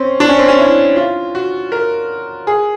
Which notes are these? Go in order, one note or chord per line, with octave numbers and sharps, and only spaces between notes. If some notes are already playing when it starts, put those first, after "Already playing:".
Already playing: C4 C#4
D4
C#4
C4
C#4
E4
F4
F#4
A#4
G#4